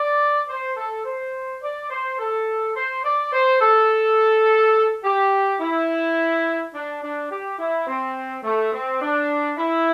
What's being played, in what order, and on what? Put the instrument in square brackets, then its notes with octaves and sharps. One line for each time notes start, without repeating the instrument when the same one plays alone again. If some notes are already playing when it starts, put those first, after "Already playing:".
Already playing: [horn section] D5
C5
A4
C5
D5
C5
A4
C5
D5
C5
A4
G4
E4
D4
D4
G4
E4
C4
A3
C4
D4
E4